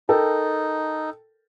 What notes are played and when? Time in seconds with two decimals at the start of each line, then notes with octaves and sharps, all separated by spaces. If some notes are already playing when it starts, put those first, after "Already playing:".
0.09 D#4 A4 A#4 G5